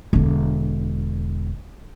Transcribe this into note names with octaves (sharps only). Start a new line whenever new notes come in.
E1 D3